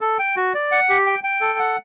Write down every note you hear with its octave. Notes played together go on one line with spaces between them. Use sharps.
A4
G5
F#4
D5
F#5
G4
G5
G5
A4
F#5